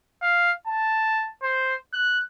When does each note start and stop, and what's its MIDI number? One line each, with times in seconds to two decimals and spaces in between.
0.22 0.52 77
0.67 1.30 81
1.42 1.75 72
1.93 2.20 90